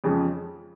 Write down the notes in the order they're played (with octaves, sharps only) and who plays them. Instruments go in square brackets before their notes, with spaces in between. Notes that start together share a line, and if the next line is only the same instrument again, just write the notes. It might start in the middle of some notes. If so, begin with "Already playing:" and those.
[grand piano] F2 C#3 F3 G#3 C#4